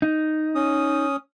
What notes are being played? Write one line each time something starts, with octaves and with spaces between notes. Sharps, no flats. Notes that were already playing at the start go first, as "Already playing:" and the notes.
D#4
C#4 D#6